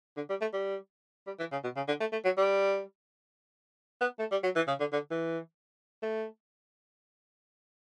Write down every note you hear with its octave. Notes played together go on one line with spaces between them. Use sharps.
D3
G3
A3
G3
G3
E3
C#3
B2
C#3
D3
A3
A3
F#3
G3
B3
A3
G3
F#3
E3
C#3
D3
D3
E3
A3